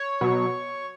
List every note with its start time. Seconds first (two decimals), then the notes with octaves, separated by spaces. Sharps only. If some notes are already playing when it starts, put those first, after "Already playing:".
Already playing: C#5
0.21 B2 F#3